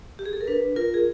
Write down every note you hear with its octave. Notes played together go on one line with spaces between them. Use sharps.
G4
G#4
A4
A#4
D4 B4
F4 A#4
G#4